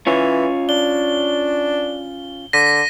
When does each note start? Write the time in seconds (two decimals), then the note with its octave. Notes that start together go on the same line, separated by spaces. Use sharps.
0.07 E3 C#4 F4 C#5
0.69 D4 G7
2.53 D3 A#6 B6 D#7